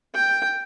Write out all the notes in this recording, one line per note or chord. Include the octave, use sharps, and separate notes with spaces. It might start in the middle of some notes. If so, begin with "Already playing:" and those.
G5